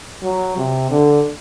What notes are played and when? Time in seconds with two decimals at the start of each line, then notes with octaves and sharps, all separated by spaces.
0.23 F#3
0.57 C3
0.91 D3